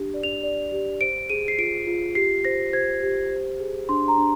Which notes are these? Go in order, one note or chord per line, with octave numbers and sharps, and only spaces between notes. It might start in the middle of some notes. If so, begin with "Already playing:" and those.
Already playing: D4 G4
D5
F7
D5
G4
C5 D7
G#4 D#7
C7
F4 D7
F4
G4 C7
C5 A#6
C5 G#6
G4
C5
G#4
D4 C6
A#5
D4